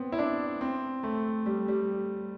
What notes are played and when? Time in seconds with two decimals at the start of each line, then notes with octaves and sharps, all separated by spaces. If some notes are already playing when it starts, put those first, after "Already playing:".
Already playing: B3 C4
0.12 E4
0.18 D4
0.61 C4
1.03 A3
1.46 G3
1.68 G3